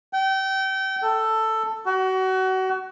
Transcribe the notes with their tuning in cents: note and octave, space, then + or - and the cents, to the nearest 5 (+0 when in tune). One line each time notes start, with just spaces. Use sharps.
G5 -30
A4 +10
F#4 +30